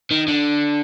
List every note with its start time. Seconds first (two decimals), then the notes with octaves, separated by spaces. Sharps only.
0.11 D#3
0.28 D3